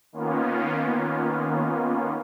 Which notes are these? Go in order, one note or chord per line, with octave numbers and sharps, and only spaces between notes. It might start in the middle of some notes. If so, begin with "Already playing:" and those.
D#3 A#3 B3 C#4 F4